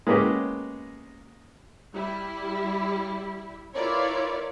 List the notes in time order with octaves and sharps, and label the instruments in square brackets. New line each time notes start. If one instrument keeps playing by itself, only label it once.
[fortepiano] G#3 A#3 B3 C#4 G4
[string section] G3 E4
E4 F4 A#4 B4 C#5 D5